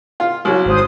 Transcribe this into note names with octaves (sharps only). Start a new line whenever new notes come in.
F4
C2 F#3
G#1 C5 D#6